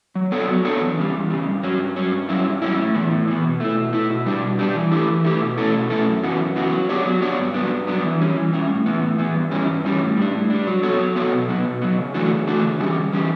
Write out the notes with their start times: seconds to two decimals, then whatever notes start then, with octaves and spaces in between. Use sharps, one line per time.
0.15 F#3
0.32 B3 D4 A4 C#5
0.48 F#3
0.64 B3 D4 A4 C#5
0.81 E2
0.97 C#3 G3
1.14 E2
1.30 C#3 G3
1.47 G2
1.63 F#3 C#4
1.79 G2
1.96 F#3 C#4
2.12 G2
2.29 F#3 C#4 E4
2.46 G2
2.62 F#3 C#4 E4
2.78 A2
2.95 E3 B3
3.11 A2
3.27 E3 B3
3.44 B2
3.60 A3 E4
3.76 B2
3.93 A3 E4
4.10 B2
4.26 G3 D4 G4
4.42 B2
4.59 G3 D4 G4
4.75 E3
4.92 A3 E4 G4
5.08 E3
5.25 A3 E4 G4
5.41 B2
5.58 A3 C#4 E4 A4
5.74 B2
5.90 A3 C#4 E4 A4
6.07 F#2
6.23 C#3 E3 B3 F#4
6.39 F#2
6.56 C#3 E3 B3 F#4
6.72 F#3
6.89 B3 D4 G4 C#5
7.05 F#3
7.22 B3 D4 G4 C#5
7.38 G2
7.54 F#3 B3 D4
7.71 G2
7.87 F#3 B3 D4
8.04 E3
8.20 G3 C#4
8.37 E3
8.53 G3 C#4
8.69 A2
8.86 E3 B3
9.02 A2
9.19 E3 B3
9.35 G2
9.51 E3 G3 C#4
9.68 G2
9.84 E3 G3 C#4
10.01 A2
10.17 G3 D4
10.34 A2
10.50 G3 D4
10.67 F#3
10.83 B3 F#4 A4 C#5
10.99 F#3
11.16 B3 F#4 A4 C#5
11.32 B2
11.49 F#3 B3
11.65 B2
11.82 F#3 B3
11.98 C#3
12.14 E3 A3 D4 F#4
12.31 C#3
12.48 E3 A3 D4 F#4
12.64 C#3
12.80 E3 G3 C#4 G4
12.96 C#3
13.12 E3 G3 C#4 G4